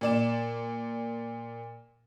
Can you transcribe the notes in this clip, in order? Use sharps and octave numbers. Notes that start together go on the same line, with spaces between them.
A#2 D5 E7